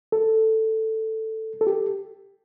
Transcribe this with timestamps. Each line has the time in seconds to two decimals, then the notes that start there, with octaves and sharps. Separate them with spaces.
0.12 A4
1.61 A4
1.67 G4